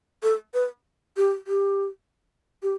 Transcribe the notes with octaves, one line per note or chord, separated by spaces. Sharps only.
A4
B4
G4
G4
G4